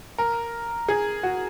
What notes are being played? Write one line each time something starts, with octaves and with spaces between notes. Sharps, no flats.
A#4
G#4
F#4